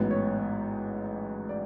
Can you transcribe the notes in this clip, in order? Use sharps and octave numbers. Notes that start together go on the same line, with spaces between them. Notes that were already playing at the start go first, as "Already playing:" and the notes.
Already playing: A1 G#2 F#3 B3
C#5
C#5
D5